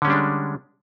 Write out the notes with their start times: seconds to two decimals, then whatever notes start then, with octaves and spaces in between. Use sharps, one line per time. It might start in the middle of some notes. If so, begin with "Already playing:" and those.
0.02 D3
0.05 C#4
0.07 G3
0.10 D4
0.13 G#3